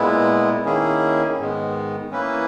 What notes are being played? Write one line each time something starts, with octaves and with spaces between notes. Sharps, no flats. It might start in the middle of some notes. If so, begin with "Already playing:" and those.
Already playing: A#2 G#3 B3 E4
D#3 A#3 C#4 E4 G#4
G#2 D#3 G#3 B3
E3 A#3 C#4 E4 B4